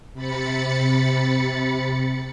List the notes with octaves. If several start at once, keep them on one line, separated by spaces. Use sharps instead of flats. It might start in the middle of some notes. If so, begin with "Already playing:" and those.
C3 B5 A6 C#7